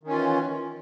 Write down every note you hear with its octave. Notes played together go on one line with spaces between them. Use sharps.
D#3 E3 C#4 F4